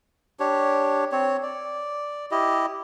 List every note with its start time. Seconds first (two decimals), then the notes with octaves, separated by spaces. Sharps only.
0.40 D4 G4 C#5
1.12 C4 C#5
1.43 D5
2.31 E4 G4 D#5